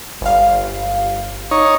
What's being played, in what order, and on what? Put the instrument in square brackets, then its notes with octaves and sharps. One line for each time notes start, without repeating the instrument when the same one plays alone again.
[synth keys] G1 F5
[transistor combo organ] D#4 C#5